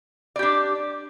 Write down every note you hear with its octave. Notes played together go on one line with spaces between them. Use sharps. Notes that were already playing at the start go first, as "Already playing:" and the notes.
D4 G4 D5